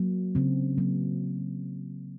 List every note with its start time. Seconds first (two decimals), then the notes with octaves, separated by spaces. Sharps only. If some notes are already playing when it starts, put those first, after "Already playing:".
Already playing: F#3 A#3
0.35 C#3 C4
0.78 F#3 A#3